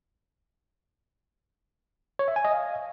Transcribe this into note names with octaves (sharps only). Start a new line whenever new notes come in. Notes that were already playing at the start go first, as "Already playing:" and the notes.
C#5
E5
G#5
D#5
F5